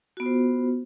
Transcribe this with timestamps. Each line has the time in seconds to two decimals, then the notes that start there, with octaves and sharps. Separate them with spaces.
0.17 F#4
0.20 B3
0.23 F4
0.26 C5